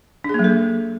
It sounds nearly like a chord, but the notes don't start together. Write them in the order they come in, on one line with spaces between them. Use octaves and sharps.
D4 G#4 A#3 F#3 A4